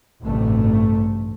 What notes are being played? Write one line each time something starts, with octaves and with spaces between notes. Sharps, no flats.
A1 D2 G2 C3 A3